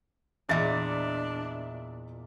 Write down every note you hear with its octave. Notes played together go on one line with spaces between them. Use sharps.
E2 A#2 D4 D#5 E5 A6